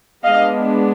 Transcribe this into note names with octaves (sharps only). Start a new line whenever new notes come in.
G#3 B3 D4 D#5 F5